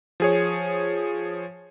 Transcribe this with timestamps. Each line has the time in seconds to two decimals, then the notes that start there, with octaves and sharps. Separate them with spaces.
0.20 F3 G#4 C#5